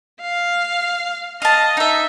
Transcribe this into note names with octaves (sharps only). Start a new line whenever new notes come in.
F5
D#5 F5 A5
D#4 E5